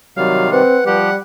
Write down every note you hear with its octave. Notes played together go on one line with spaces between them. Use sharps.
C3 D#3 F#3 G3 F5
C4 B4 F#5
F3 G3 G4 F#5